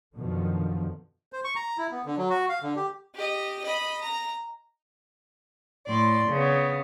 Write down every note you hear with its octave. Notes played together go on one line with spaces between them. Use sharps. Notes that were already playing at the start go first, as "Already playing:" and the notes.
F#2 B2 D3 D#3 F3
C5
C#6
A#5
E4
B3
D3
F#3
F#4
F5
D3
G4
G4 D#5
D#5 B5
A#5
A2 D5 C6
C#3 B3